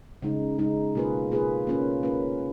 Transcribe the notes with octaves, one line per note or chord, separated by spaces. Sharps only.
C#3 G#3 D#4
C#3 G#3 D#4
B2 A#3 F4 G#4 B4
B2 A#3 F4 G#4 B4
A#3 C#4 F4 B4
A#3 C#4 F4 B4